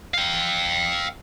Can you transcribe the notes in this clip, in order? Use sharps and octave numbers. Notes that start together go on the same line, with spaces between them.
F5 G5